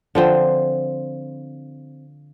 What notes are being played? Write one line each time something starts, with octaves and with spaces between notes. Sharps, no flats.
D3 F3 C4